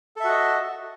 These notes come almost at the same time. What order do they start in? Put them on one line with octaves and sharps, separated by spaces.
A4 E5 F#4 D#5